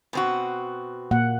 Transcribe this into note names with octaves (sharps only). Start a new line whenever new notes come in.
B2 C4 F#4
A#2 A#3 F#5